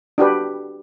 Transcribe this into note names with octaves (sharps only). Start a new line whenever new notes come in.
D4 F#4 G4 B4